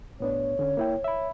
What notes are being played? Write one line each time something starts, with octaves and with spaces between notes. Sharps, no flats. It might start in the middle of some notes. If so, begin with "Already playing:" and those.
A2 B3 D4 C#5
D3 C#4
A#3 E4 G5
E5 B5